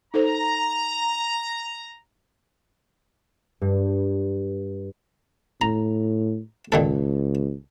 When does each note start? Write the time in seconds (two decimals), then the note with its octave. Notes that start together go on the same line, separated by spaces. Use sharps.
0.14 D#4 A4 C5 A#5
3.61 G2
5.61 A2 A#5
6.72 C#2 A#2 D#3 A4